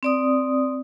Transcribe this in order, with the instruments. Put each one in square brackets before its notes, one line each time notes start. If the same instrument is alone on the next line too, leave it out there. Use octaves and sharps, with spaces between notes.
[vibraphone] C4 D5 D#6